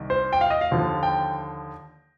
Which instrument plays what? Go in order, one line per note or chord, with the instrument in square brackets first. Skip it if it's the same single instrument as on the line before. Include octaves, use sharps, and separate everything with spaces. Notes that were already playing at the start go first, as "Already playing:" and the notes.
Already playing: [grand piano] C2 D#3
C5
G5
F5
D#5
F5
D#2 D3 F3
G5